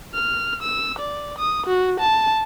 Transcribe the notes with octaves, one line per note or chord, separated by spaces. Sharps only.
F6
E6
D5
D#6
F#4
A5